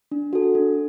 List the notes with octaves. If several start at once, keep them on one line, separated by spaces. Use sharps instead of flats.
D4
F#4 A4
D4